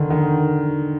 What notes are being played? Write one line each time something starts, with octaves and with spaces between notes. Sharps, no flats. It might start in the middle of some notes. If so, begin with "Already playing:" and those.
Already playing: D3 D#3
D#3